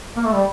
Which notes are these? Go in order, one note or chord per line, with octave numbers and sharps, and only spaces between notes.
A#3
A3
G3